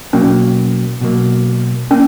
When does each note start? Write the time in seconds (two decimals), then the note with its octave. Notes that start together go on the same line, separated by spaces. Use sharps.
0.13 B2 F#3 A#3 C#4
1.01 B2 F#3 A#3
1.91 A#3 C#4